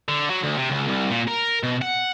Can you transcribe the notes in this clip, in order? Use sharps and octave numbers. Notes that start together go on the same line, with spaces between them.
D3
F#3
D2
C3
C#2
C2
A#2
A#4
B2
F#5